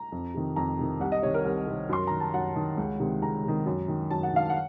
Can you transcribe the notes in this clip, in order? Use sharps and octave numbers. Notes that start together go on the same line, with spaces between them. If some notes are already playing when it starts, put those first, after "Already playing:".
Already playing: A#5
F2
C3 D#3
F2 A#5
C3 D#3
C2 F#5
D#5
C3 D#3 C#5
A#4
C2 A#4
C3 D#3
F#2 C6
D#3 A#5
A5
F#2 F#5
D#3
C#2
C3 D#3
C#2 A#5
C3 D#3
F#2
D#3
F#2 A5
F#5
D#3 F5
F#5